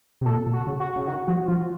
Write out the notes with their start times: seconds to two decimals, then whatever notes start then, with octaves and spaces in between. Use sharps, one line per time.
0.21 C3
0.26 A#2 A4
0.47 A#2
0.53 F#4
0.67 C#3
0.80 F#4
0.96 C#3
1.07 D#3 F#4
1.27 F3 F#4
1.47 F3 F4